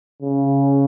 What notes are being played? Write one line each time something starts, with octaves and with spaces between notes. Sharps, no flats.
C#3